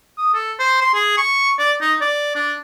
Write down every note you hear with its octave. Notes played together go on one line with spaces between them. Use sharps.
D#6
A4
C5
C6
G#4
C#6
D5
D#4
D5
D4